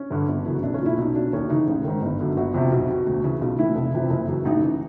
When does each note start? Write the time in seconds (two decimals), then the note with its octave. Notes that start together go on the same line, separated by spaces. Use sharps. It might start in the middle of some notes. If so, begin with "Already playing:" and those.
Already playing: C#4
0.11 G2 D3
0.29 G1
0.45 F#2 C#3 E3
0.63 B1 D4
0.74 C#4
0.81 A#2
0.86 E4
0.97 B1 D#4
1.15 B2 D4
1.33 D#2 C#4
1.49 C#3 E3 D#4
1.67 A1
1.84 G#2 D#3
2.02 G1
2.20 F#2 D3
2.37 G1 F#4
2.54 F2 C3
2.72 B1
2.89 B2
3.07 D2
3.24 C#3 E3
3.41 B1 F4
3.59 A2 E3 E4
3.75 F1
3.94 F2 C3 E3
4.10 F#1
4.28 F#2 C#3 E3
4.45 A1 D#4
4.63 E3